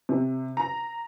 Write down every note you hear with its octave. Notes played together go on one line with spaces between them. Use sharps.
C3
A#5